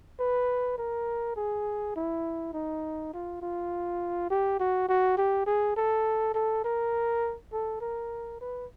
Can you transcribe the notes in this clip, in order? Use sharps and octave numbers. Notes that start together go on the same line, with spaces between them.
B4
A#4
G#4
E4
D#4
F4
F4
G4
F#4
F#4
G4
G#4
A4
A4
A#4
A4
A#4
B4